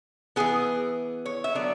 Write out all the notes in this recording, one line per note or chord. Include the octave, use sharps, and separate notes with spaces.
E3 B3 G#4
C#5
E5
D3 F#3 B3 D5